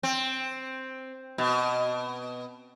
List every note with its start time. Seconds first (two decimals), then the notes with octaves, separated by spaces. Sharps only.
0.03 C4
1.38 B2